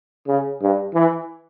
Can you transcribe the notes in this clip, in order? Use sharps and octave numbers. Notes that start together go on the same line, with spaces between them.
C#3
G2
E3